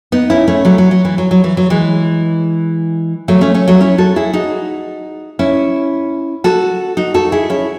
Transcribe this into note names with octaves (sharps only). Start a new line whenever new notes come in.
B3 D#4
C#4 E4
A3 C#4
F#3 A3
F#3
F#3
E3
F#3
F#3
E3
F#3
E3 G#3
F#3 A3
A3 C#4
A3 C#4
F#3 A3
C#4 E4
F#4 A4
E4 G#4
D#4 F#4
C#4 E4
F#4 A4
D#4 F#4
F#4 A4
E4 G#4
C#4 E4